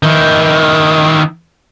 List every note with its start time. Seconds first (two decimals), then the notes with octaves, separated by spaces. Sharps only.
0.03 D#3 E4